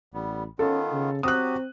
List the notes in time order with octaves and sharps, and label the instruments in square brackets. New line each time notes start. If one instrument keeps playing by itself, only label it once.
[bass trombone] A1 [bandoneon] G3 B3
[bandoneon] D#3 B3 F4 [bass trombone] C#4 [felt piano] A4
[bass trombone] C#3
[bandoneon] F#3 F#4 G4 [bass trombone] C4 [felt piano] D#6 F#6